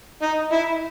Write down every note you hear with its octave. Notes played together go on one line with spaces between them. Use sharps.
D#4
E4